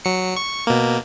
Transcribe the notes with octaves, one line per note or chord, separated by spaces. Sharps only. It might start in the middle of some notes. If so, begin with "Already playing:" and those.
F#3 C#7
C#6
B2 A#3